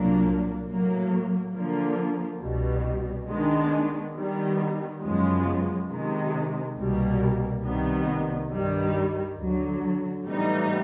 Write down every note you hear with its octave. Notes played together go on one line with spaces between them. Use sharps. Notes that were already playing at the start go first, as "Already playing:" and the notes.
Already playing: C2 A#2 F#3 A#3 D4
A2 F#3 A#3
D3 F3 A#3
C2 B2 G3
D#3 G#3 B3 D4
D#3 G3 B3
F#2 C#3 F3 G#3 B3
C3 D#3 G#3
C2 B2 G3 A#3
C2 C3 D#3 G3 B3
G2 D#3 G3
D2 D3 F#3
A2 E3 G3 B3 D#4